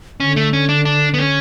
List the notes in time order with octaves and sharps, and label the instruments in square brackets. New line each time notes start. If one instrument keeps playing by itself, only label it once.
[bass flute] D3 [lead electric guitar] C#4
[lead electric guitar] A3
C#4
D4
D4
B3
C#4